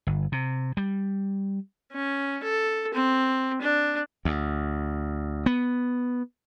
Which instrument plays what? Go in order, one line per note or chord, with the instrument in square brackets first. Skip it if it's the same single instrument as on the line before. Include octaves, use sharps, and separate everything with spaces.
[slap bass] G1
C3
G3
[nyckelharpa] C#4
A4
C4
D4
[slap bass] D2
B3